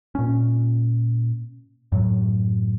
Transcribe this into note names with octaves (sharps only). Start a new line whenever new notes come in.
A#2 C#4
F#2 A2 F#3